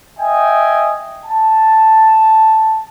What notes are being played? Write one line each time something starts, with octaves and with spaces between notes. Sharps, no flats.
D#5 E5 G5 G#5
A5